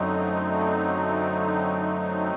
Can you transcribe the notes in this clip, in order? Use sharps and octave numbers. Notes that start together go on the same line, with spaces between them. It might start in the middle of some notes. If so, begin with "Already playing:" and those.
Already playing: F#2 D3 F#3 A3 C4 D#4